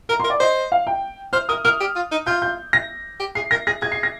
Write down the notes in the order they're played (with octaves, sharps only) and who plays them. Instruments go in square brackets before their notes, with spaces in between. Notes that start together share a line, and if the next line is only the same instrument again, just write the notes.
[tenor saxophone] A#4 [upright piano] A#5
[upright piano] C6
[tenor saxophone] A#4
[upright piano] D5
[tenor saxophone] C5 [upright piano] D#5
[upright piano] F5
G5
[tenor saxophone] C5 [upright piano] F6
[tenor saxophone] A#4 [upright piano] D#6
[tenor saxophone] A#4 [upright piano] F6
[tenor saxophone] G4
F4
D#4
[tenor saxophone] F4 [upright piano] G6
[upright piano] G6
A#6
[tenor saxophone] G4
[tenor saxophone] G#4 [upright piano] C7
[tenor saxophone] A#4 [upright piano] A#6
[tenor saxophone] G#4 [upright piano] A#6
[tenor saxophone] G#4 [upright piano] G#6
[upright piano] C7
A#6